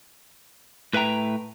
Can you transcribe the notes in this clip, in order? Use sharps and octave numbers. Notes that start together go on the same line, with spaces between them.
A2 B4 E5 G5 A#5